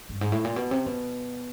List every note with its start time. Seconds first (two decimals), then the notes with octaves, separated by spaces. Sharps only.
0.09 G2
0.21 G#2
0.32 A2
0.45 A#2
0.56 B2
0.71 C3
0.86 B2